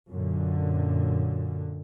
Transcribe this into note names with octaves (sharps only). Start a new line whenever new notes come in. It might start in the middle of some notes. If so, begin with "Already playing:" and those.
F#2 A#2 D3